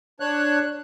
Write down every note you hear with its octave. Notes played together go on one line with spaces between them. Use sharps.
D4 C#5 F#6